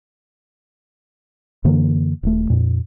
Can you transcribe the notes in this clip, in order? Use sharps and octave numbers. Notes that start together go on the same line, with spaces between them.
F#2 D3 E3 A#3
D#1 A3
F2 A#2